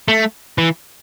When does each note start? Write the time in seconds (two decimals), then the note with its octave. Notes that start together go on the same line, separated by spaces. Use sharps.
0.08 A3
0.58 E3